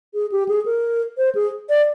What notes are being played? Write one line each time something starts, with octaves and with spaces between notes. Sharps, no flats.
G#4
G4
G#4
A#4
C5
G#4
D5